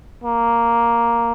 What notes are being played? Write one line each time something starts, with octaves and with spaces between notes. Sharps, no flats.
A#3